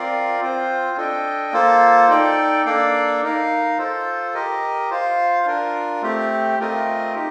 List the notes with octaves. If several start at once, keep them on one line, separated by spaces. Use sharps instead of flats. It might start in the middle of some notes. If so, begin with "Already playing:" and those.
Already playing: C4 F4 A#4 D5 F5
C4 F4 C5
D4 A4 D#5 G5
A#3 F4 A4 C5
D#4 A4 D5 G5
A#3 D4 A4 D5 F5
D#4 A#4 F5
F4 A4 C5
G4 A#4 D#5
F4 C5 F5
D4 F4 A#4
A3 C4 G4
A3 C4 F4 A#4 D#5
D#4 G4